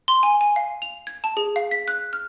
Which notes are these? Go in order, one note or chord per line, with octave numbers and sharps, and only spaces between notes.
C6
G#5
G#5
F5
F7
G#6
A5
G#4
F5
B6
F#6
F6